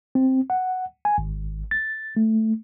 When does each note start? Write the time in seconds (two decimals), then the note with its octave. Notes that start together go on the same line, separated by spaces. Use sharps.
0.15 C4
0.50 F#5
1.05 G#5
1.18 G#1
1.71 A6
2.17 A3